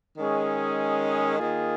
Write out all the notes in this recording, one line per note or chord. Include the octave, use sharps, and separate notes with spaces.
D#3 G#3 C#4 G#4
D#3 A#3 F4 G#4